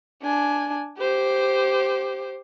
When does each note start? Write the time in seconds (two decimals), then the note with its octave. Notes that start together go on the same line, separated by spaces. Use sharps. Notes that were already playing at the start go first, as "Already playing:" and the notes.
0.22 D4 G#5
0.98 G4 C5